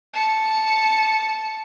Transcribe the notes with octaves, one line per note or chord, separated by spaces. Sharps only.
A5 C#7